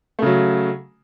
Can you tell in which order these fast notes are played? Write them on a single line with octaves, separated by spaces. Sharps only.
A3 C#3 F#3